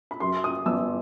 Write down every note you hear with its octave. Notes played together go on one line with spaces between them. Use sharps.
B5
F#2 C6
D#6
G1 E6